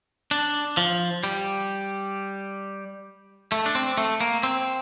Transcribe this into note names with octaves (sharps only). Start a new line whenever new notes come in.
D4
F3
G3
A3
D4
C4
A3
A#3
C4